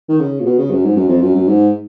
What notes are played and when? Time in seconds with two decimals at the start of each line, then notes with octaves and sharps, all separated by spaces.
0.09 D#3
0.21 C#3
0.40 A#2
0.45 B2
0.58 C#3
0.70 F#2
0.84 G#2
0.96 F#2
1.08 F2
1.22 F#2
1.35 F#2
1.48 G#2